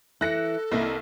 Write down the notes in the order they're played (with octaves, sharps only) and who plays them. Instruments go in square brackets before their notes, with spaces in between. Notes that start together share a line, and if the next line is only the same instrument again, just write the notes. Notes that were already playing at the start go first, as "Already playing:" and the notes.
[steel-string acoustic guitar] E3 E4 [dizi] A4 [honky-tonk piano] F#6 A#6 C#7
[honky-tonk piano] C2 A#3 E4 [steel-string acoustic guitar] C4 D#5